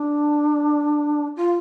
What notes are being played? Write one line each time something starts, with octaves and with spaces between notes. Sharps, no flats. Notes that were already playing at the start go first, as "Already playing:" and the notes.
Already playing: D4
F4